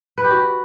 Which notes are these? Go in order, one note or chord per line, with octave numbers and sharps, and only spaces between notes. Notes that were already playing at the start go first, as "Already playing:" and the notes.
B4
G4
F#4